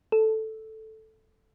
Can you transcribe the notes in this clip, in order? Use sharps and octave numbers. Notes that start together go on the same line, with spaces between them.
A4